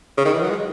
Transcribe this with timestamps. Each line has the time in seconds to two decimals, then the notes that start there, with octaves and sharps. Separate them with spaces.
0.18 C#3
0.25 D#3
0.34 E3
0.42 F#3
0.50 G#3